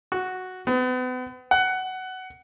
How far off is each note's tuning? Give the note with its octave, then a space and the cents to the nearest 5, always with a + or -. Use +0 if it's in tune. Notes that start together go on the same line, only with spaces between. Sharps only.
F#4 +0
B3 +40
F#5 +15